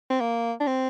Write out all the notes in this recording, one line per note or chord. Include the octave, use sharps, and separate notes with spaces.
C4
A#3
D4
C4